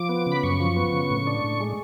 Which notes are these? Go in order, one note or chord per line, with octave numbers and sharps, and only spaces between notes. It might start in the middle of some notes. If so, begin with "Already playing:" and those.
Already playing: F3 D6
B3
C#3
B5
F#2 C#6
F3
B3
C#3
A2
D4
A2
G#3